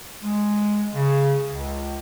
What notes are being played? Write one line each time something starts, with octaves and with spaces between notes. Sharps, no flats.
G#3
C#3
C#2